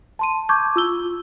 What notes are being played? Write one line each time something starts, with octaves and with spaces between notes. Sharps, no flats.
A5 C6 D#7
A5 C#6 D6 G6 G#6
F4 E6 G7